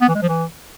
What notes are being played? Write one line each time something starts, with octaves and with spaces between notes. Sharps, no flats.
B3
E3
G#3
F3
E3